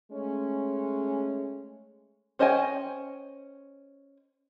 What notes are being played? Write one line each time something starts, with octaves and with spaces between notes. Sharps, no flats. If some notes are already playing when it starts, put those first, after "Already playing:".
G#3 A3 C#4
C#4 C5 D#5 G5 G#5